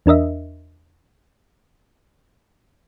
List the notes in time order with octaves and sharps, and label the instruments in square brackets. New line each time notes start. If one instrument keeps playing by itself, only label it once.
[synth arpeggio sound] E2 D4 A#4 D#5 E5